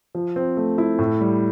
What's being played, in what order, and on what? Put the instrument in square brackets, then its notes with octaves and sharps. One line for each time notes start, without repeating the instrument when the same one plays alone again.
[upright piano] F3
C4
A3
E4
A2
G3